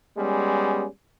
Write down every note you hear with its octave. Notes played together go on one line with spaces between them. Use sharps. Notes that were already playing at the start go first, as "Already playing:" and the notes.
G3 G#3 B3 C#4